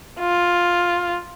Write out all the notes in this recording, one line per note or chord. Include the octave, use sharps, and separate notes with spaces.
F4